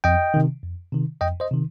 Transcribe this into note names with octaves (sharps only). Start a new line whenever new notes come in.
F2 D#5 G5
C3 D#3
F2
C3 D#3
F2 D#5 G5
C5 D#5
C3 D#3